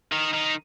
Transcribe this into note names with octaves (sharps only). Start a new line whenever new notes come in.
D#3
D#3